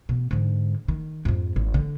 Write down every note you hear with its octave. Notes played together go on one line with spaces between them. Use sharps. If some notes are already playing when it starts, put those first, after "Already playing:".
B2
G#2 D3
D#3
F2 G#2
G#1
D3